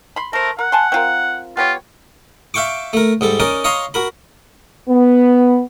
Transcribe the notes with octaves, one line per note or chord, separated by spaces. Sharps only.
B5 C6
A3 A#4 C5
A#4 F#5
G#5 A5 C6
C4 F4 A#4
B3 F4 G4 C#5
E5 F5 G5 C#6 D6
A3 A#4
G#2 G3 A4
C#4 D#4 A#4 D5
C#5 D#5 F5 A#5 C6
F#4 A#4 B5
B3